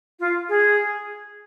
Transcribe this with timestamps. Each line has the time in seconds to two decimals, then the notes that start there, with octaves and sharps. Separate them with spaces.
0.20 F4
0.49 G#4